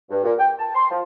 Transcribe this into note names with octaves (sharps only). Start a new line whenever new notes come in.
G2
A#2
G5
A5
C6
F3